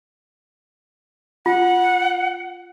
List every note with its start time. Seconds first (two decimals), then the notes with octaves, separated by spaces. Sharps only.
1.46 F4 F#5